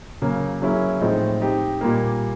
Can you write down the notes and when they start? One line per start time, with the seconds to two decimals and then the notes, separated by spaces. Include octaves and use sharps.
0.22 C#3 F#3 A#3
0.62 F#3 A#3 C#4 E4 G#4
1.01 A2 F3 G#3 C4 D#4
1.41 C4 D#4 G4 C5
1.81 A#2 G3 A#3